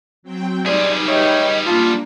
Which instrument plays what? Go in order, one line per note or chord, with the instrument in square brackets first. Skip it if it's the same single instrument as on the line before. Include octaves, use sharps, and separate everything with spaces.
[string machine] F#3 C4 G5
[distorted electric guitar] G3 G#4 [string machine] D#4 G4 B4 [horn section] C5 E5 [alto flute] D5
[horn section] C#5 E5 G5 [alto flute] D#5
[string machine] A#3 D4 [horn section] F4 [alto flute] A5